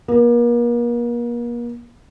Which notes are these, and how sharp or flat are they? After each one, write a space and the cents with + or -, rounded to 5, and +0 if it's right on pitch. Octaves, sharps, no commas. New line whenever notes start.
A#3 +40